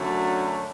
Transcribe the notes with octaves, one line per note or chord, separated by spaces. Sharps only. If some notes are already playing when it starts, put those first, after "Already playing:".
Already playing: F#2 D3 F#3 A3 D4